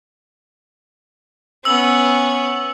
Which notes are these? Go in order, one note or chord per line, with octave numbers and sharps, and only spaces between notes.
B3 C#4 E6 F#7